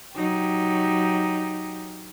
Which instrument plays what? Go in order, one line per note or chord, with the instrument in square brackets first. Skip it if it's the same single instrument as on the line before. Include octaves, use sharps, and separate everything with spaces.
[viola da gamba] F#3 D#4 G4